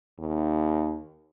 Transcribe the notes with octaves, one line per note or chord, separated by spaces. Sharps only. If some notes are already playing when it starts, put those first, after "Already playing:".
D#2